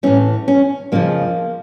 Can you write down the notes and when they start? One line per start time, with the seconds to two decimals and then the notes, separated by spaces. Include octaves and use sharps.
0.03 A2 E3 C#4
0.48 C#4
0.92 F2 C#3 F3 A#3